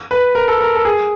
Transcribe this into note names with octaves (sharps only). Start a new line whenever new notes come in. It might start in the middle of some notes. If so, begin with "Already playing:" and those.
B4
A#4
A4
A#4
A4
G#4